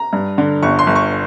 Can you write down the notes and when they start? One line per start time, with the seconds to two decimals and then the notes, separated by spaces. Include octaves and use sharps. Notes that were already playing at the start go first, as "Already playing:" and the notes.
Already playing: A#5
0.13 G2
0.38 D3
0.63 G1 C#6
0.79 C6
0.87 G1
0.96 C#6